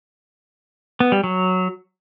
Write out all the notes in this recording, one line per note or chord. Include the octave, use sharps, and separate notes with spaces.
B3
G3
F#3